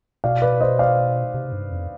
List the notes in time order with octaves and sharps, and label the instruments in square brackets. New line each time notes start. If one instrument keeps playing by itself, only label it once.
[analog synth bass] B2 [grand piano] D5 F5
[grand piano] B4 D5
C5 D#5
D5 F5
[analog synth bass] C3
G2
F2